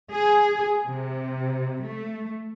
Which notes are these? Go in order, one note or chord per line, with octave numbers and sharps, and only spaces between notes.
G#4
C3
A3